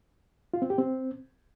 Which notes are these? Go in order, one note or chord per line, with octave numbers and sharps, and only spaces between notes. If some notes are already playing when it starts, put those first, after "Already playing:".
F4
C4
G4
C4